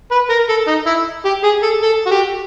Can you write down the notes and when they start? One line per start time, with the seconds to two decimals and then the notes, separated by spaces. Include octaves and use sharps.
0.11 B4
0.30 A#4
0.49 A4
0.67 D#4
0.87 E4
1.25 G4
1.44 G#4
1.63 A4
1.83 A4
2.06 F#4
2.11 G4